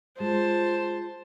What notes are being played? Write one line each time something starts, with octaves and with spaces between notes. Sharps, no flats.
G#3 F4 C5 A5